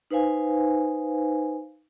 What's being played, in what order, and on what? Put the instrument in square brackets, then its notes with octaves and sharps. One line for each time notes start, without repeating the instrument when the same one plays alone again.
[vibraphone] D#4 B4 C5 F5 G#5